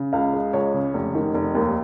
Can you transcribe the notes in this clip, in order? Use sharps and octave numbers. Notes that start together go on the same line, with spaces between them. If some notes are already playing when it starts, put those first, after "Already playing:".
Already playing: C#3
C#2 F5
G#3
C#2 C#5
C#3
F1
D#3
F1
D#2